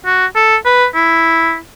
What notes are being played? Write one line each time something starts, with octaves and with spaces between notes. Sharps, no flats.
F#4
A4
B4
E4